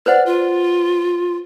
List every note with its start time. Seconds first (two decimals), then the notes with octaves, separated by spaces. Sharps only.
0.06 B4 C5 D5 F#5
0.26 F4